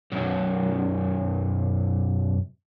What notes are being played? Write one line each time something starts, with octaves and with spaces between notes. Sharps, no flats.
B1 F#2